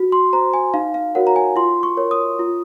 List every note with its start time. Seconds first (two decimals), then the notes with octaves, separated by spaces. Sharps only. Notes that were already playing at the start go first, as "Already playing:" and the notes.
Already playing: F#4
0.12 C6
0.33 C5 A#5
0.54 G#5
0.74 D#4 F5
0.94 F5
1.15 F#4 A#4 C#5 F#5
1.27 A#5
1.36 G#5
1.56 F4 C6
1.83 C#6
1.97 A#4 C#5
2.11 D#6
2.39 F4